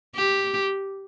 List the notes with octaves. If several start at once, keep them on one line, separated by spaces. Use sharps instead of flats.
G4